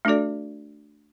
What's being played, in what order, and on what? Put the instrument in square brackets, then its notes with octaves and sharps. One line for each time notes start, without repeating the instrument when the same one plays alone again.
[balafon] A3 D4 F#4 A4 D5